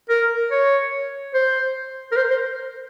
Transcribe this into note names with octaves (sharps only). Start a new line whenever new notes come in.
A#4
C#5
C5
A#4
C5
C5